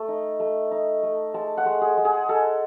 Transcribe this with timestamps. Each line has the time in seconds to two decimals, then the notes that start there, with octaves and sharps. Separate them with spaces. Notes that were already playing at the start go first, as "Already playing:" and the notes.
Already playing: A3 A5
0.08 D#4
0.40 A3
0.71 D#4
1.03 A3
1.34 G#3 A5
1.57 F#5
1.66 G#3
1.81 G#4
1.97 G#3
2.05 G#4
2.29 G#3 A4